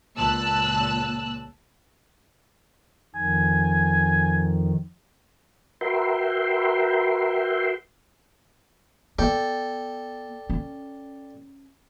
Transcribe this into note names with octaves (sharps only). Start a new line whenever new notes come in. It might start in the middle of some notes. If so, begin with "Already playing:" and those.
C#2 A#2 A5 E6 F#6
F2 D#3 G#5
F#4 A#4 B4 E5 G5 C6
B3 A4 D5 G5
C#4